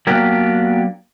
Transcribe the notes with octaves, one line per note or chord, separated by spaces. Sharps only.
F#3 A#3 B3 D4 G4